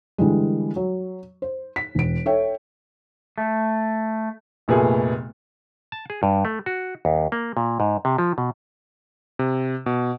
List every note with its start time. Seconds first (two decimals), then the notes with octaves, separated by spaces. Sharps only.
0.18 D3 E3 G3 G#3
0.76 F#3
1.42 C5
1.76 B6
1.95 E1 D7
2.26 A4 C#5 E5 G5
3.38 A3
4.68 F1 A#2 A3 B3 G#4
5.92 A5
6.10 G#4
6.23 G2
6.45 A3
6.66 F#4
7.05 D#2
7.32 A#3
7.57 A#2
7.80 G#2
8.05 C3
8.18 F3
8.38 B2
9.39 C3
9.86 B2